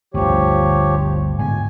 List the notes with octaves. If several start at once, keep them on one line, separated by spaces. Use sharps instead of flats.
G1 D2 F3 G4 C#5
G#2 D3 B3 G#5